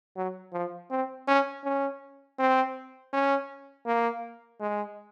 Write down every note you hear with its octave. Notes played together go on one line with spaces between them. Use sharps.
F#3
F3
C4
C#4
C#4
C4
C#4
A#3
G#3